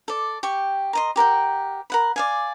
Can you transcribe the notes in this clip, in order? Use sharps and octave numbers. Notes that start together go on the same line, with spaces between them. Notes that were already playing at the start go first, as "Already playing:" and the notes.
A4 D5
G4 G5 C#6
A#4 D#5 C6
G4 A#4 F#5 G5
A#4 F#5 B5
D5 F5 G#5